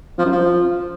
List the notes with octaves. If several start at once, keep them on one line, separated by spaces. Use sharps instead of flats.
F3
F#2
F3